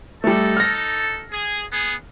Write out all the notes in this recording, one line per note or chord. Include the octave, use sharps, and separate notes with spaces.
G3 A3 D#4 A4
F6 A#6
G#4
B3 G#4